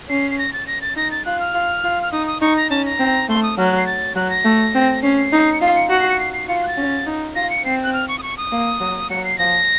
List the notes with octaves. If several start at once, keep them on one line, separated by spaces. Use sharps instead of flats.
C#4 C7
C7
A#6
A6
A#6
A6
D#4 A#6
A6
F4 F#6
F6
F4
F4
F6
D#4 D#6
D#6
D#4 C#6
A#5
C#4 A5
A#5
C4
A3 C6
D#6
F#3 F6
F#6
C7
A6
F#3 F#6
A#6
A3
C4
C#4 C7
C7
D#4
C#7
F4 C7
C#7
F#4 C#7
C7
C#7
C7
C7
F4 C#7
C7
F#6
A6
C#4
D#4
F4 A#6
C#7
C4 C7
F#6
F6
C#6
D#6
C#6
D#6
A#3
F#3
F#3 C#7
C7
F3 A#6